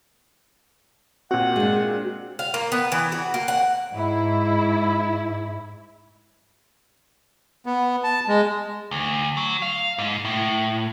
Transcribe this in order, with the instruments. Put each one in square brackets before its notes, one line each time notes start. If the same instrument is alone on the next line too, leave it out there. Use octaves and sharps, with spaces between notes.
[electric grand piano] A#2 C4 [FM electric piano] F#4 [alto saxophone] F#5
[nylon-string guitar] G#3 D4
[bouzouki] F5
A#3
B3
E3
F#4
A#3
F#5
[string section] G#2 E4
[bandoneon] B3
A5
G#3
[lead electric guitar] D2
F#3
F5
G#2
A2